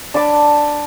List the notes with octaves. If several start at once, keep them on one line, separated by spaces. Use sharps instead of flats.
D4 A5 B5 D6